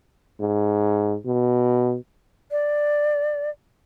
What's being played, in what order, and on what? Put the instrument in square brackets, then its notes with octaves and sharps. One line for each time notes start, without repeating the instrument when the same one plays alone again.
[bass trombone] G#2
B2
[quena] D5